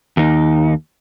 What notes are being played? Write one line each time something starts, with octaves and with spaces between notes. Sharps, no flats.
D#2 D#4